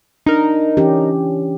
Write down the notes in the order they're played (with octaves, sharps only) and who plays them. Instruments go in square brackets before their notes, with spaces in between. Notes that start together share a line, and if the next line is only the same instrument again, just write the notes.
[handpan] D4 [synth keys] D#4 A#4
[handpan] E3 C#4 G4